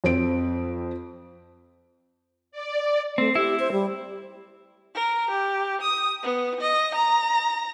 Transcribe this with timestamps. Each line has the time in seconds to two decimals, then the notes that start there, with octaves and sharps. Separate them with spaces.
0.04 F2 C4 D7
2.51 D5
3.18 A3 C4
3.35 E4 G4
3.59 C5
3.72 G3
4.95 A#4
5.30 G4
5.81 D#6
6.23 B3
6.61 D#5
6.95 A#5